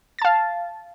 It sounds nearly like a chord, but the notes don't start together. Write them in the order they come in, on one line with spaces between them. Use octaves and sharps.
A6 A5 F5